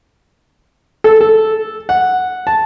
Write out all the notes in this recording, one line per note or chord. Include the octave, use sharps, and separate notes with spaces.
A4
A4
F#5
A5